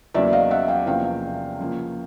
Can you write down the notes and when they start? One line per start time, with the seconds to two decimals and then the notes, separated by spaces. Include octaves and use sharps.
0.14 E2 C#3 F#3 A#3 C#4 D5 E5
0.33 D#5 F5
0.51 E5 F#5
0.68 F5 G5
0.86 E2 C3 F3 A#3 C#4 F5 G5
1.59 C#3 F3 A#3 C#4